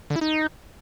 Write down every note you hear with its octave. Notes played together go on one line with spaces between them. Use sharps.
D3
E4
D#4